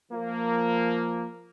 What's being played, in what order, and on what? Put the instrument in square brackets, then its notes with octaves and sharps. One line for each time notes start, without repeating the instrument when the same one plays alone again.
[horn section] F3 A#3